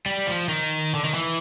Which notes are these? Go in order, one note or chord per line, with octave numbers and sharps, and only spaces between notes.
G3
F3
D#3
D3
D#3
E3